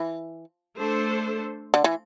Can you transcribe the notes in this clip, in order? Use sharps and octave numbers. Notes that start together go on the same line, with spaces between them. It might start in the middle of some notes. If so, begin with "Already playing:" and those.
Already playing: E3
A3 D4 A4 C5
D3
E3